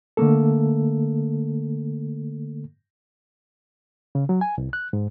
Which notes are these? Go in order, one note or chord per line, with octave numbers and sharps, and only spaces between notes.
D3 A3 A#3 A4
C#3
F#3
G#5
C2
F#6
G#2